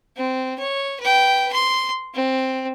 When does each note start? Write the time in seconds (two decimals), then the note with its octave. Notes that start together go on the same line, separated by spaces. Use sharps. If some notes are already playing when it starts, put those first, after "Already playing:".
0.16 C4
0.59 C#5
1.00 B4 G5
1.52 C6
2.14 C4